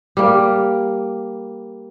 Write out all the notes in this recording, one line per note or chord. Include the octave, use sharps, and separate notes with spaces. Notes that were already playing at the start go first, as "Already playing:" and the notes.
G3 A#3